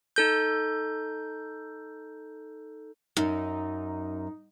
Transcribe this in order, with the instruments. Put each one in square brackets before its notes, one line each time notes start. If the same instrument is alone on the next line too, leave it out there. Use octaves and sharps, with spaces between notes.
[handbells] D#4 A4 G6
[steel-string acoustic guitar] F#2 [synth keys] D#4